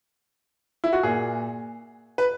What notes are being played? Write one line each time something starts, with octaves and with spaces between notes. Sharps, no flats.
E4
F#4
A#2 A#3 G#4
B4